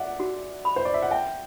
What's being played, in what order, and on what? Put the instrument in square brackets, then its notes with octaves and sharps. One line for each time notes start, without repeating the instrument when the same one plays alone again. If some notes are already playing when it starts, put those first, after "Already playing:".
Already playing: [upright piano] D5 E5 F#5
[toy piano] F#4
B5
[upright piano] C5
D5
E5
F#5
[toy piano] E5 [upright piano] G5